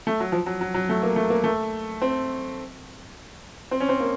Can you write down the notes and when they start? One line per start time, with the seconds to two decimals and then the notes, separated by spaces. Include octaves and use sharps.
0.07 A3
0.20 F#3
0.32 F3
0.46 F#3
0.61 F#3
0.74 F#3
0.89 A3
1.03 A#3
1.16 A3
1.30 A#3
1.44 A3
2.02 C4
3.71 C4
3.80 C#4
3.89 C4
4.00 A#3